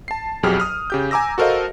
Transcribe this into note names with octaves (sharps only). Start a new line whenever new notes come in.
A5 C7
B1 F2 F#3 G4 G#4 F6
D#6 F6
C#3 G4 G6
G#5 A#5 D6 E6 A#6
F#4 A4 A#4 C5 D#5 F5